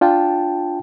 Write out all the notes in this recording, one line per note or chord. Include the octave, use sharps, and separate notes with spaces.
D4 F4 G5 A5